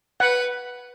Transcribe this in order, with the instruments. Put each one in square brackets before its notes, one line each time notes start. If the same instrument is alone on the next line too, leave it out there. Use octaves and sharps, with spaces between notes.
[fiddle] B4 [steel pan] F#5